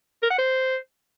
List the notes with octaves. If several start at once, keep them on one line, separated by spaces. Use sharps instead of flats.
A#4
F#5
C5